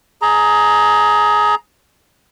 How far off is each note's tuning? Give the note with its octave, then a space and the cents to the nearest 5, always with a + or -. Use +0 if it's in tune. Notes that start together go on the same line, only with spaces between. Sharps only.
G#4 +20 A#5 +0